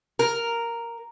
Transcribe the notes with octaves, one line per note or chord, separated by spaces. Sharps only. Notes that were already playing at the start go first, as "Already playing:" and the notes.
A#4